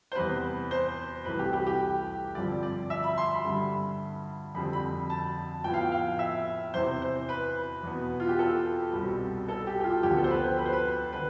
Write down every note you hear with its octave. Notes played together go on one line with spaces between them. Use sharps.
C5
E2 C3 G3 B3 B4
C5
C2 C3 E3 A3 B4
G4
G4
G4
G2 D3 F3 C4 D5
D5
E5
B5
C6
B5
G2 D3 G3
F2 D3 G3 C4 B5
B5
A5
A2 F3 B3 G5
F5
G5
F5
E5
E2 C3 E3 C5
C5
B4
E2 B2 B3
F4
G4
A4
C2 B2 G3 C4
A4
G4
G4
F4
D2 D3 F3 B3 G4
A4
C5
B4
C5
B4
C5
B4
D3 B4